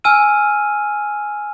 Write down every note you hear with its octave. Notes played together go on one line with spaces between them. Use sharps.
G#5 E6 F6 D#7